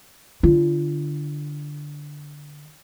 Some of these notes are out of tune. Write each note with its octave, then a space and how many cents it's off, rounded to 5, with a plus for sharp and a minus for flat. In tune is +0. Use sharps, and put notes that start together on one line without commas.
D3 +0 F4 -30